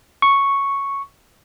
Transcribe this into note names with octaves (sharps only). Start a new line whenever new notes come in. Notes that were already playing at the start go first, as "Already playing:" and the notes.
C#6